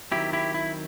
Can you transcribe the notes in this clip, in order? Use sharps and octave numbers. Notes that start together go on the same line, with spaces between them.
D#3 F#3 C4 E4 G4
E4 G4
E4